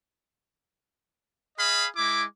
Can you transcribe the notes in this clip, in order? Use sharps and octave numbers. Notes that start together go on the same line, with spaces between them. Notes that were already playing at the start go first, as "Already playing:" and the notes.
G#4 D#5 F5 B5
G#3 E4 D6